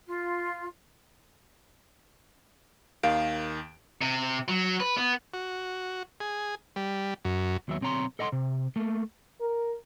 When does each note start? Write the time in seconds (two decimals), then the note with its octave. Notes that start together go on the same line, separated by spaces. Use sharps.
0.06 F4
3.03 D#2 D#3 F5 D7
4.02 C3
4.48 F#3
4.80 B4
4.97 B3
5.34 F#4
6.20 G#4
6.76 G3
7.25 F#2
7.68 D#2 F#3 B3 E5
7.81 B1 C4 C#5 A#5 C6
8.19 A4 D#5 F#5 A#5 C6
8.32 C3
8.76 A3 A#3
9.41 A#4